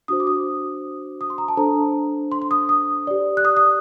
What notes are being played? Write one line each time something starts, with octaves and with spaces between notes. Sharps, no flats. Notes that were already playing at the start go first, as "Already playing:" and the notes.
D4 F#4 C5 D#6
D6
D#6
D#6
C6
A#5
A5
D4 A4 C5 A#5
C6
C6
D#6
D#6
G4 D5
F#6
D#6
D#6